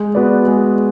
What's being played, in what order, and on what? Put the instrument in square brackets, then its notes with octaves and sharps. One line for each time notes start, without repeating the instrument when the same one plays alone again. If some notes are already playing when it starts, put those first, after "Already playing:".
Already playing: [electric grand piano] G#3
B3 F#4 B4 D5
G#3